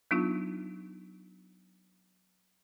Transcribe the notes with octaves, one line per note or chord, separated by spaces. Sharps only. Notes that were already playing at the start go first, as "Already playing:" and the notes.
F#3 B3 D4 D#4 F4